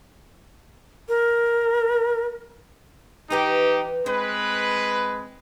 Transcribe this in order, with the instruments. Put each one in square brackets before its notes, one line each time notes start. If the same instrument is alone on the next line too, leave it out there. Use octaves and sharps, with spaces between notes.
[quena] A#4
[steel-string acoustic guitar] E3 B4 A#5 [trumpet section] D#4 G4
[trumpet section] G#3 B4 [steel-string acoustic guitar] C4